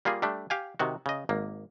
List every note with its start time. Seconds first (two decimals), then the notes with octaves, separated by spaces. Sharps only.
0.05 G3 A#3 F4 G#4
0.22 G3 A3 D4
0.50 G4 F5 G#5
0.79 C3 D#3 F#4
1.06 C#3 D#5
1.29 G#1 A#3